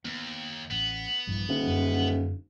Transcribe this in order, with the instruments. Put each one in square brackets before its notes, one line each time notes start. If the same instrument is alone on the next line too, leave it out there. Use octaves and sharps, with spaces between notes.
[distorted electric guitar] D#2 [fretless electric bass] B3
[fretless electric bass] A1 [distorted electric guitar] B3
[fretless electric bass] A#1 G2 E3
[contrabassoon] D#1 [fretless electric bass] D3
[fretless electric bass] F#2 D3